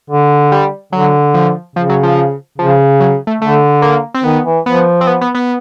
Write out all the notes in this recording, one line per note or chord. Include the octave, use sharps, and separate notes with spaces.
D3
G3
D3 F#3
F3
C#3 F3
F#3
F3
C#3 F3
F#3
A3
D3 A3
A#3
C4
D#3 B3
E3
F3 B3
C4
B3
B3
B3